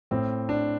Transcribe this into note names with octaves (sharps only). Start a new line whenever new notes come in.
A2 C4
D4